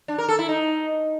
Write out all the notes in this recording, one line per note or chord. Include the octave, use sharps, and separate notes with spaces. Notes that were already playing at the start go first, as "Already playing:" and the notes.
D4
A#4
A4
E4
D#4